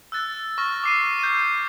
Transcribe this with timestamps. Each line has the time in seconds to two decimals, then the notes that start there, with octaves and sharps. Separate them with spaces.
0.12 E6 F#6 A6
0.58 C#6 F6 A#6
0.84 D6 C7 D#7
1.19 G6 D#7